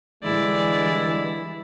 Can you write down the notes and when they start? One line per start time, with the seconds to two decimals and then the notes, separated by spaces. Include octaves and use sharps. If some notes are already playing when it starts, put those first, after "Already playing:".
0.24 D3 E3 G3 G#3 E4 D5